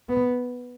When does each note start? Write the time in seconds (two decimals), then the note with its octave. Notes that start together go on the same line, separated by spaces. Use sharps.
0.09 B3